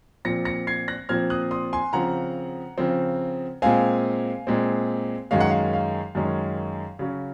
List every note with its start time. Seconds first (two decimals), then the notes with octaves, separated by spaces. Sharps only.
0.25 A#2 F3 C4 A#6 C#7
0.45 A#6 C#7
0.67 G#6 C7
0.88 F#6 A#6
1.09 A#2 F3 C4 F6 G#6
1.30 D#6 F#6
1.51 C6 D#6
1.73 G#5 C6
1.93 C#3 F3 C4 F#5 A#5
2.78 C#3 F3 C4
3.62 A#2 G#3 C4 F5 G#5
4.47 A#2 G#3 C4
5.31 F#2 D#3 G#3 C#4 F5
5.40 F#5
5.50 F5
5.73 F5
6.15 F#2 D#3 G#3 C#4
6.99 C#3 F#3 C#4